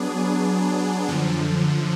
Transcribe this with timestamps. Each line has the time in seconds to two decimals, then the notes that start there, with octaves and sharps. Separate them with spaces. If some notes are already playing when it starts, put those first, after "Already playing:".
Already playing: F#3 B3 D4 G#4
1.08 F#2 D3 F3